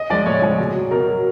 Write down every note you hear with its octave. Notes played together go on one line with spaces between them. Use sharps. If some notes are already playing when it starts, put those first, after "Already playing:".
Already playing: D#5
F3 G#3 D5
A2 C#5
F3 G#3
B2
F#3
B2 A#4
F#3